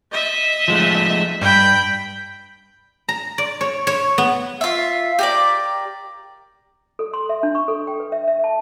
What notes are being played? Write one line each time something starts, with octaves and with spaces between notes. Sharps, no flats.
D#5 E5
F3 G#3 A3
G2 G5 B5
A#5
D5
C#5
C#5
B3
F4 E5
G4 A#4 D5
A4
C6
E5
D4
C#6
A4
G5
B4
E5
E5
A5